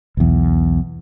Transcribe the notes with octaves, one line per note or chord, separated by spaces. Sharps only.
B1 E2